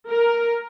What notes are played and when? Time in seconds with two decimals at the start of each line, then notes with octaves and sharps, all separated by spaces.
0.10 A#4